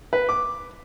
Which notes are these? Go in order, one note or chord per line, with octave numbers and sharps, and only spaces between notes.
B4
D6